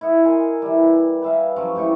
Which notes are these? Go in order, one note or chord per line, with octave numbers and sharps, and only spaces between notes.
E4 D#5 F#5
A#4 G#5 C6
E3 G3
B4 E5 F5
F3 F#3 C#4
A2 G3 G5 C#6